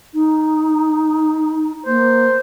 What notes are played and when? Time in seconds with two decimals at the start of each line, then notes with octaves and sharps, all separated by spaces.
0.14 D#4
1.86 A#3 C5